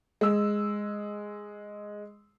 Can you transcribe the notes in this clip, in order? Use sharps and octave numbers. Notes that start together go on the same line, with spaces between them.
G#3 E6